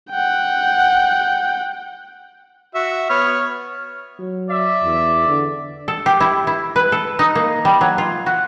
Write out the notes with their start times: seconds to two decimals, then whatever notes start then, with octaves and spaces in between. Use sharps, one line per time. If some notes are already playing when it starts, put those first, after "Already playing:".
0.11 F#5 G5
2.75 F#4 E5
3.10 B3 C#5 F6
4.19 F#3
4.50 D5 E5
4.84 E2
5.28 D3
5.88 A4
6.06 G4
6.20 E4
6.47 E4
6.76 B4
6.92 A4
7.19 D#4
7.35 A#3
7.65 G3
7.81 F#3
7.98 F4
8.26 F#4